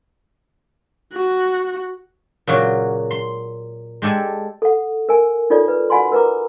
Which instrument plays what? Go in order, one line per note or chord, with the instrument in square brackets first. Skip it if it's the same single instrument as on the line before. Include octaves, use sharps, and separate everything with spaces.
[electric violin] F#4
[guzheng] A#2 C#3 F#3 F#4
C6
G#3 G4 A4 D5 G#5
[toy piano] A4 F#5
A#4 G#5
D#4 F4 A4 C#5 D5
B4
F#4 D5 F#5 G#5 B5 C6
A#4 B4 A#5 D6